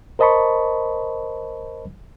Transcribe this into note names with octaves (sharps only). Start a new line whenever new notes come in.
A#4 C5 D#5 A5 B5 C#6